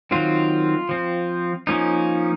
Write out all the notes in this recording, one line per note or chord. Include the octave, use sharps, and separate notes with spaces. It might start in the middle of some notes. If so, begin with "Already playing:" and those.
D#3 F#3 C4 F4
F3 C4
F3 A#3 C#4 D#4